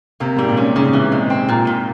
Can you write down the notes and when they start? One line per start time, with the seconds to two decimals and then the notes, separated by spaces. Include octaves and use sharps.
0.20 C3 A#3
0.37 G#2 G3
0.48 A#2
0.57 C#4
0.76 G#2 C#3
0.93 A#2 E3
1.12 C3 G#3
1.30 C4
1.49 A#2
1.67 A#2